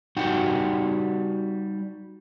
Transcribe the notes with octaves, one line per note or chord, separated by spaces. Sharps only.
G3 D#4 F#4 F#5 G5